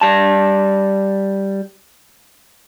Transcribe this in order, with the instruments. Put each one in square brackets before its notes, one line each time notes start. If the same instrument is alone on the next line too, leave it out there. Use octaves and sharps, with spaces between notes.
[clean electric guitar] G3 A5